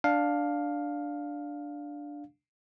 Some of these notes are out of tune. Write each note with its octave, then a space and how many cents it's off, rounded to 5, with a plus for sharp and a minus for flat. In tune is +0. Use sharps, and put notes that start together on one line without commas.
D4 +0 F5 +10